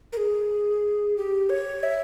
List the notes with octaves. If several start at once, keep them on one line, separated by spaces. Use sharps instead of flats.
A#4
G#4
G4
C#5
E5